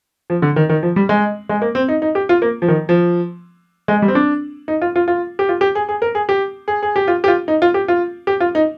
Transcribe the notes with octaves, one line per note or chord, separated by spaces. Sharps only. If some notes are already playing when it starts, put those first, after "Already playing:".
F3
D3
D#3
D#3
F3
G3
G#3
G#3
A#3
C4
D#4
D#4
G4
F4
A#3
F3
D#3
F3
G#3
G3
C4
D4
D#4
F4
F4
F4
G4
F4
G4
G#4
G#4
A#4
G#4
G4
G#4
G#4
G4
F4
G4
F4
D#4
F4
G4
F4
G4
F4
D#4